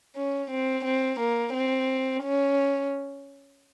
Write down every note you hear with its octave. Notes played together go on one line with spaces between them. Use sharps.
C#4
C4
C4
A#3
C4
C#4